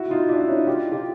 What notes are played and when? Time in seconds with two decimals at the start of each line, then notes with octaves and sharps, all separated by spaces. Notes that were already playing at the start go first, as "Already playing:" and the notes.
Already playing: E4 F#4
0.10 D#4 F4
0.29 D4 E4
0.41 E4
0.48 C#4 D#4
0.67 F4 G4
0.92 F4 G4